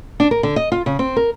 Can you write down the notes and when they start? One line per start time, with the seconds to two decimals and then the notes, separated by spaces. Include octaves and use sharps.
0.20 D4
0.31 A#4
0.43 D3
0.56 D#5
0.72 F4
0.86 C#3
0.99 C4
1.16 A#4